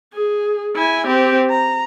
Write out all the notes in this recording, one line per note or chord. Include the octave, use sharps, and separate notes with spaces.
G#4
E4 G#5
C4 G4
A#5